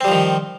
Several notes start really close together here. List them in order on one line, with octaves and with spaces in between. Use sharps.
C4 G3 F3 D#3